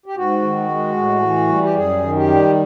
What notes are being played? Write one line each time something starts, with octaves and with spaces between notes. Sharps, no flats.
G4
G#2 F#4
D#3
G#3
A2
E3
G3
G4
F#2 G#4
D#3
G4
G3